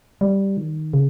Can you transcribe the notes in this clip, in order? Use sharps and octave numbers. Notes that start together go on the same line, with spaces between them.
G3
D#3
C#3